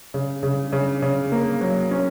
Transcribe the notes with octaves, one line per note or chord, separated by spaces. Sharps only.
C#3
C#3
C#3
C#3
A#3
F#3
C#4